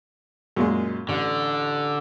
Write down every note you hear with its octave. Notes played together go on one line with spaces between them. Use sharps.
F#2 A#2 G#3
A1 D3